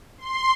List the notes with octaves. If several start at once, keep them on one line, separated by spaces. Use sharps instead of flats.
C6